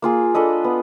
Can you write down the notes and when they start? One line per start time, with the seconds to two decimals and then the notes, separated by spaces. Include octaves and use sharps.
0.02 A#3 F4 G#4
0.34 D4 A4 B4 D#5
0.64 B3